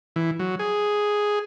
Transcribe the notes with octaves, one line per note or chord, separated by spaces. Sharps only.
E3
F#3
G#4